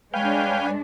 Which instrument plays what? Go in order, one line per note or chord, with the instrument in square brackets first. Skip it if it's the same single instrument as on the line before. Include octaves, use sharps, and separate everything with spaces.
[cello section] G#3 D4 [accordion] B4 C#5 G#5 [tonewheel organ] F5 G5